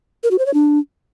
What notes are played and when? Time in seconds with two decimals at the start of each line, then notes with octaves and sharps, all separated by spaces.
0.23 A#4
0.31 F#4
0.39 C5
0.46 C#5
0.54 D4